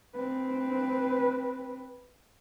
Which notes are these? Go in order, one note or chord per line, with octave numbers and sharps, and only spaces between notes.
C4 B4